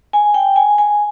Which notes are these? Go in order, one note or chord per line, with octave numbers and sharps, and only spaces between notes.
G#5
G5
G#5
G#5